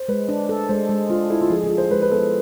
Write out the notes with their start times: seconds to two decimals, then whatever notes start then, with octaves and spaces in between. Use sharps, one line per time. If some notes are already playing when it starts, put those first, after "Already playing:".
Already playing: C5
0.08 G#3 B4
0.29 D4
0.49 A4
0.69 G#3 C5
0.89 G#3
1.10 D4 F4
1.30 E4 A4
1.41 F4
1.50 F3 G#4
1.63 G#4
1.71 F4
1.78 C5
1.91 G#3 B4
2.02 B4
2.11 B3 A4